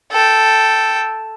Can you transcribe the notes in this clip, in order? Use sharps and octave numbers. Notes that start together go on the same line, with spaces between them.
A4 G5